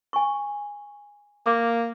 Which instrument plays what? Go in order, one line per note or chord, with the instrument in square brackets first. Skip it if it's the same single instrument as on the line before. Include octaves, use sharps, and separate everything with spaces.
[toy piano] G#5 C#6
[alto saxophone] A#3 [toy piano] D6